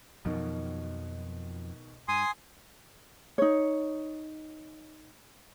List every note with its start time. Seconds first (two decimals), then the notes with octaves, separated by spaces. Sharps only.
0.25 F2 B2 D#3 F3 F#3
2.08 G2 G#5 C6 D#6
3.38 D#4 C#5